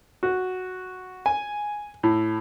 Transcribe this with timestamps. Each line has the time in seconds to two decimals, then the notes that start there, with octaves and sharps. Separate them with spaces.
0.23 F#4
1.26 G#5
2.03 A2